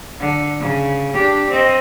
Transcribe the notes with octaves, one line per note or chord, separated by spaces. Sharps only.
D3
C#3
D4 G4
C4 D#5